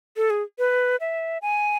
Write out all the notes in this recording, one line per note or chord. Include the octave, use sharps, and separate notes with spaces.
A4
G#4
B4
E5
G#5